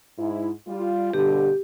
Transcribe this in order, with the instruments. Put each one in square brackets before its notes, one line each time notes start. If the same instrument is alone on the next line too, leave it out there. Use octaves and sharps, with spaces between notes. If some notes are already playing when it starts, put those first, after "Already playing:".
[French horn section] G#2 E4
G3 F4
[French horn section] G2 B2 D3 [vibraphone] G4